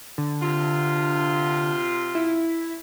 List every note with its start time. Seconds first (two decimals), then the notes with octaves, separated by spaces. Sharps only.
0.18 D3
0.42 C3 F4
2.15 E4